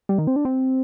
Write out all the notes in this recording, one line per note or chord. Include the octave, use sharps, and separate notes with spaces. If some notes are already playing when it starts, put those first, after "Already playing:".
G3
D#3
C4
D4
C4